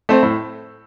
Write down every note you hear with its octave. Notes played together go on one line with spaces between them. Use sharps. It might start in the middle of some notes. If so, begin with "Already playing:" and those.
A3 C4
A2